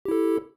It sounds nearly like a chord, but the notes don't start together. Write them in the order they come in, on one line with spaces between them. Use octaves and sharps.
G4 E4 A4